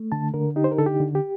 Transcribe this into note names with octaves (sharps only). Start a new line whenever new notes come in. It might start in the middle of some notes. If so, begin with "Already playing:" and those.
Already playing: A3
D3 A5
D3 A#4
D#4 G4
C5
A#4
D3 A4
G4
D3
G4